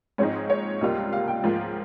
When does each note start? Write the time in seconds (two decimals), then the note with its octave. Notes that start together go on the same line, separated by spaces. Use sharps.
0.18 G#2 F3 G#3 C4 D#4 C#5
0.50 C#5
0.81 C#2 C3 G3 A#3 F4 D#5
1.13 F5
1.28 G5
1.43 G#2 F3 A#3 F4